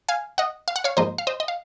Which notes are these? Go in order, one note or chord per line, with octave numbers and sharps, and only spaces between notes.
F5 G#5
D#5 F#5
F5
F#5
C#5 F5
G#2 F3 A#3 C5 D#5
F5
C5 D#5
D#5
F5